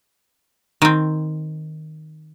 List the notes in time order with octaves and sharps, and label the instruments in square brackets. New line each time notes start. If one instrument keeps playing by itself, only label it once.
[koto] D#3 C4